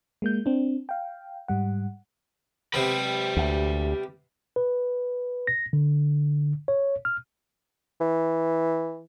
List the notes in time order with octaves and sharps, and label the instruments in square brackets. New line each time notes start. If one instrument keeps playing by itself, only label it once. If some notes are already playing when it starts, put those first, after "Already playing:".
[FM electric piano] G#3 A#3 G6
C4 D4
F5 G5
G#2 G3 F#5
[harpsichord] C3 B3 [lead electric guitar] G4 B5
[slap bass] D2
[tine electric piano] B4
A#6
D3
C#5
F6
[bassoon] E3